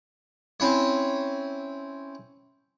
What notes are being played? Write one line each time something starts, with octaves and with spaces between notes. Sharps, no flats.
C4 C#4 E4 C#5